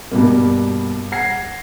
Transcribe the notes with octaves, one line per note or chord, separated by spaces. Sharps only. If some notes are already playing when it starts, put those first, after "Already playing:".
G2 B2 G3 A#3
F#5 G#6 A#6 C7